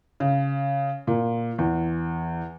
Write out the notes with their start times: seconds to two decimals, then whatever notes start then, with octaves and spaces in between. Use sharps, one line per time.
0.20 C#3
1.07 A#2
1.59 E2